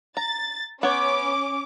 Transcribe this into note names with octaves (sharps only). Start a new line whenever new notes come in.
A#5 A6
B3 C#4 C#5 D6